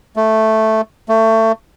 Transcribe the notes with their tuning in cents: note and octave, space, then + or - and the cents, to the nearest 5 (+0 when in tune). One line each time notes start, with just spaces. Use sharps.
A3 +0
A3 +25